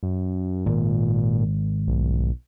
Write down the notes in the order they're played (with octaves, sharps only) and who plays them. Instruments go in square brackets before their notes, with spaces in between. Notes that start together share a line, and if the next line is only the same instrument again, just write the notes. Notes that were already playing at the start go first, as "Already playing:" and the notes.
[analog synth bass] F#2
[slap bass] G#1 [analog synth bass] A#2
[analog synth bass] B1